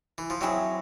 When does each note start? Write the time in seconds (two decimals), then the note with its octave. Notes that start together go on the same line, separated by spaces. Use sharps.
0.18 E3
0.30 F3
0.41 F#3 C4 E4 G#4